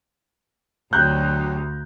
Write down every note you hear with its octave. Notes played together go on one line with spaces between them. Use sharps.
D2 F#3 D4 G4 A#5 F#6 G6